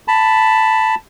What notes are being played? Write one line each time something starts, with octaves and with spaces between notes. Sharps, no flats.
A5 B5